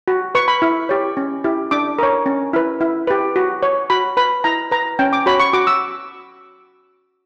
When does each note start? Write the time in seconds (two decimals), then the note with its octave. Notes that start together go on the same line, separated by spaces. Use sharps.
0.08 F#4
0.35 B4 C#6
0.48 B5
0.62 E4
0.89 G4 C#5
1.17 C#4
1.44 E4 G4
1.71 D4 D6
1.99 A#4 C#5
2.26 C#4
2.53 E4 B4
2.81 E4
3.07 G4 B4
3.36 F#4
3.63 C#5
3.90 F#4 B5
4.17 B4 B5
4.44 E4 A#5
4.71 B4 A#5
4.99 C#4 G5
5.13 D6
5.26 F#4 C#5 B5
5.40 C#6
5.53 F#4 D6
5.67 E6